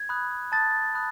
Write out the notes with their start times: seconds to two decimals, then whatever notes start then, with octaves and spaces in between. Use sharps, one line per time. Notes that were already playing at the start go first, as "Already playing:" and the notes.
Already playing: G#6
0.09 B5 D#6 F#6
0.52 A5 D#6 F#6 A6
0.95 B5 D#6 F#6